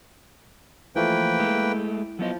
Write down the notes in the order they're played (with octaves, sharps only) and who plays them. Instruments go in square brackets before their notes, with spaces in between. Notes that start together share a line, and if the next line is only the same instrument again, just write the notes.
[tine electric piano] E3 F3 A3 [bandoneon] A#3 B4 G5
[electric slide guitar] G#3 A3 [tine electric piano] E4
[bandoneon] F3 [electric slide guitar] F#3 B3 D#5